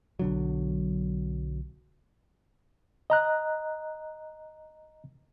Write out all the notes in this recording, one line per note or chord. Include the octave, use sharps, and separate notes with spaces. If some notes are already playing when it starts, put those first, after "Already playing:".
B1 D3 F#3
D#5 A#5 F#6